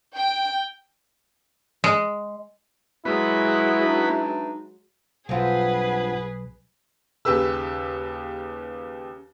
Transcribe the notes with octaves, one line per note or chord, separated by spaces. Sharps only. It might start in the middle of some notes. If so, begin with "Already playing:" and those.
G5
G#3
F#3 G#3 B3 E4 F#4 B4
E3 D4 D#4
B1 G2 C4 F4 G#4 B4 F#5
D#2 C#3 G4 B4 E6